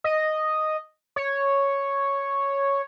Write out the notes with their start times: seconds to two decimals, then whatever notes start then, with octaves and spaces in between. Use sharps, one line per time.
0.04 D#5
1.16 C#5